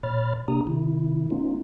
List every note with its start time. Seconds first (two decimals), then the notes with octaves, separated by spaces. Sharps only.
0.03 A#2 C#5 B5 F6 A6
0.48 C3 A#3 D4 G4 A#5 D#6
0.67 C3 D#3 E4
1.30 A3 B3 C#4 D#4 F4